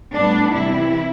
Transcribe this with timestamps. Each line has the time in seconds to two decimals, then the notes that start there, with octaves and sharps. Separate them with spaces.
0.14 A2 G3 B3 D4
0.54 C3 E3 G3 E4